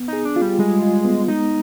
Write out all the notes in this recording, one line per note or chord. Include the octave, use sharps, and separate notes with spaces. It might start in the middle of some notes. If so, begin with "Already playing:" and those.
Already playing: B3
D#4 G#4
D4
F4
G3
G3 G#3
F4
B3
G#3 D#4